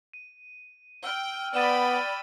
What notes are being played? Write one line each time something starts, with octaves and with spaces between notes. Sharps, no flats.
D#7
G5 E6 F6
B3 D5 G5 B5 A6 D#7 E7